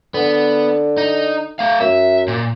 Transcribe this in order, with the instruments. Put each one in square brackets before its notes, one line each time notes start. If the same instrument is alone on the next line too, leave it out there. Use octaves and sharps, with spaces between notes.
[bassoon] D3 [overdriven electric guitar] B3
[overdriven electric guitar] D#4
A3 F5
[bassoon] F#2 [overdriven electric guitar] E5
[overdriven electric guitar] A#2